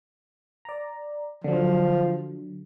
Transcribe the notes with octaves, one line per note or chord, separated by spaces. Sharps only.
D5 A#5
D3 F3 F#3